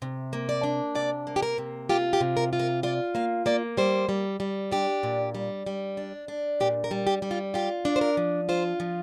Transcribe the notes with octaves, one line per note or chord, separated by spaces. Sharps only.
C3
A#3
D5
D4
C3 D5
A#3
G4
A#4
C3
F4 G4
G4
C3
A#4
F4
A#4
F4 D5
A#3 F5
A#3 D5
G3 C5
G3
G3
D4 G4
A#2
G3
G3
D4
D4
A#2 G4
A#4
G3
G4
G3
F4
F4 G4
D4
C5
A#4
F3
F4 C5
F3